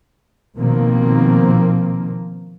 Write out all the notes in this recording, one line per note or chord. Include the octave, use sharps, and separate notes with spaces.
B2 D#3 F3 A#3 C4